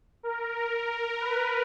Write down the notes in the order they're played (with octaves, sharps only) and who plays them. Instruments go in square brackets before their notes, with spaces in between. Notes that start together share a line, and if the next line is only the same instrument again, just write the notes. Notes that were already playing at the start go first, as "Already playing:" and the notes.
[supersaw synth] A#4
A#4
B4